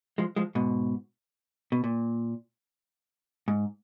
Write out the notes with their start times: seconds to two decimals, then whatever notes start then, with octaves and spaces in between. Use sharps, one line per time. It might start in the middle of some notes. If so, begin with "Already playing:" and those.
0.18 F3 G#3
0.36 F3 G#3
0.55 G#2 B2
1.72 B2
1.84 A#2
3.48 G#2